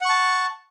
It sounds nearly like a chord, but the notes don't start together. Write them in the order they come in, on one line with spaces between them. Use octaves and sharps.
F#5 C#6 A5